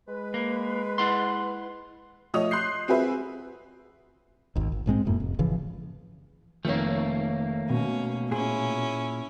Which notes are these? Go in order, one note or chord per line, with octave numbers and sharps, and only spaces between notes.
G#3 B4
A#3
E4 F#5 C6
F3 A3 C#5 D#5 D#6 F7
C6 F#6 G6 C7
C4 F4 F#4 G#4 B4 E5
G#1 D#2
G#1
A#1 G#2 G#3 C4
E1 F#2 A2 A#3
F1
G#1 C#3 E3 F3
F1 D#3 F3 A3 A#3 C#5
B2 C#4
A#2 C#4 E4 G#4